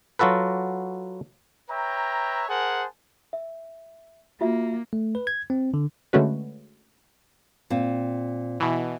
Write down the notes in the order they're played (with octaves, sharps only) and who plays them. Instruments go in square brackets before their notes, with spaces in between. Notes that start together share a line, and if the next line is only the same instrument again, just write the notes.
[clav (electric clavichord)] F#3 F4 F#4 A4 B4
[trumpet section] B4 C#5 E5 G5 A#5
G#4 A#4 C5 F#5 G#5 A5
[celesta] E5
[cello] A#3 [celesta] F4 F#4 E5
[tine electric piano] A3
B4
G#6
C4
D3
[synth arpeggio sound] D3 G#3 A3 C#4 F#4 B4
[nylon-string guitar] A#2 C4
[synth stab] B2 E3